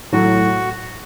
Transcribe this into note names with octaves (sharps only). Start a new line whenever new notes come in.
A2 F#3 A3 F#4